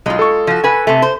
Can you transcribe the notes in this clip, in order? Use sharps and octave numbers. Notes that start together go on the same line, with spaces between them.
B1 G#3 F4
A4 C#6
F3 F#4
B4 G#5
C3 A3
C5